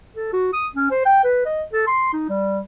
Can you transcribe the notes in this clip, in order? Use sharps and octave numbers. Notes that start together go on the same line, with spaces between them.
A4
F#4
D#6
C#4
C5
G5
B4
D#5
A4
C6
D#4
G3